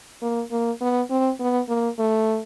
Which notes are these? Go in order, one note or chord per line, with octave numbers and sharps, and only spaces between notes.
A#3
A#3
B3
C4
B3
A#3
A3